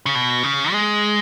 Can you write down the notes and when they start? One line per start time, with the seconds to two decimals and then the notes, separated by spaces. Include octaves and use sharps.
0.06 C#3
0.15 B2
0.43 C#3
0.72 G#3